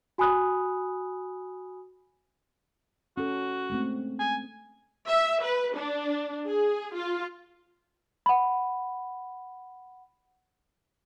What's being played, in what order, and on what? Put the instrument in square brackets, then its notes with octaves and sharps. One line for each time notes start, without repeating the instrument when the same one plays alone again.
[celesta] F#4 G#5 B5 D#6 F#6
[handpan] C#4 A4 [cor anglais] F#4
[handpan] G#3 A3 C4
[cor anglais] G#5
[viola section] E5
B4
D4
G#4
F4
[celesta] F#5 B5